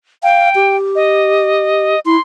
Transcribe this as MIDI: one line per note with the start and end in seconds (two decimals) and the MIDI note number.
0.23 0.49 77
0.23 0.76 79
0.55 1.95 67
0.95 2.00 75
2.06 2.16 64
2.06 2.21 84